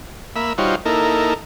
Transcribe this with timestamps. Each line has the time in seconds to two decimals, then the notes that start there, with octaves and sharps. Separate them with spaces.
0.36 A#3 E5 B5
0.58 G3 D#4 F4 F#4 C5 C#5
0.85 A#3 D#4 E4 A4 A#4